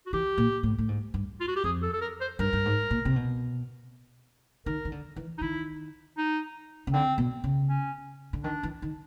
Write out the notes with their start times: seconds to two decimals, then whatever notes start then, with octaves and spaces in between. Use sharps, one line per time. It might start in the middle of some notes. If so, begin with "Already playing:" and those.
0.06 F#4
0.13 E3 G4
0.38 A#2
0.63 A2
0.78 A2
0.89 G#2
1.14 G2
1.40 F4
1.48 F#4
1.56 G4
1.64 F2 G#4
1.83 A4
1.93 A4
2.01 A#4
2.21 C5
2.39 G2 A#4
2.53 G2
2.65 G#2
2.91 A#2
3.05 C3
3.16 B2
4.66 D#3 A#4
4.85 D#3
4.92 D3
5.16 E3
5.38 D#4
5.41 D#3 E4
6.18 D#4
6.87 C#3
6.93 D3 C4
7.18 B2
7.44 C#3
7.69 C#4
8.33 D3
8.44 D#3 D4
8.63 E3
8.82 D#3